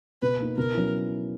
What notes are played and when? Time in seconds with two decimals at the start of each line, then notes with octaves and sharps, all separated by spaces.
0.22 B2 B4
0.39 A#3 D#4
0.57 B2 A#4
0.74 F#3 C#4 E4